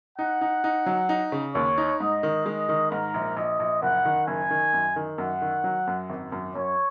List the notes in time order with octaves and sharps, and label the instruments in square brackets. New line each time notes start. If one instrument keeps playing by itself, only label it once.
[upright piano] D#4 [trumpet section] F#5
[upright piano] D#4
D#4
F#3
D#4
C#3
[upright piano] D#2 [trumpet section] C#5
[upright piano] D#4
[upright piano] G#2 [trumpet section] D#5
[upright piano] D#3
[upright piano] G#3 [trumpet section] D#5
[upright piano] D#3
[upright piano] G#2 [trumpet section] A#4
[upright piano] A#1
[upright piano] A#1 [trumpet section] D#5
[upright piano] A#1
[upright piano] F#1 [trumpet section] F#5
[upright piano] D#3
[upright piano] F#1 [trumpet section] G#5
[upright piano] D#3
F#2
D#3
[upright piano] F#2 [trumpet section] F#5
[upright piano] D#3
F#3
F#2
G#1
F#2
[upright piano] F#2 [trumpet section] C#5